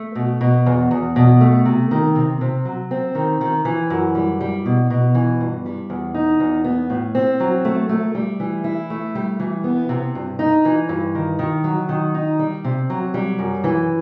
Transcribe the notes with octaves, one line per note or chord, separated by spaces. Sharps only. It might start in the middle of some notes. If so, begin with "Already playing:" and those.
Already playing: A3
B2
B2
E2
E2
B2
A3
C3
D#3
C3
C3
F#3
C4
D#3
D#3
E3
F#2
G3
G3
B2
B2
E3
G2
G3
E2
D#4
E2
B3
A2
C4
F#3
A3
A3
G3
E3
E4
A3
G3
E3
B3
C3
G2
D#4
E3
G2
D#3
D#3
F#3
D#3
D#4
G3
C3
F#3
G3
F#2
E3